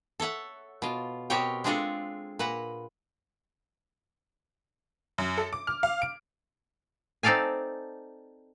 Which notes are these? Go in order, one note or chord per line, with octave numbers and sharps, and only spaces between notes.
A4 C#5 E5 F#5
B2 F4
B2 C4 G4 A#4 C#5 G5
G#3 C4 D4 F4 G#4 A4
A#2 B4 F#5 A#5
F#2
A4
D6
F6
F5
D7
C4 D#4 A4 D5 F5 G#5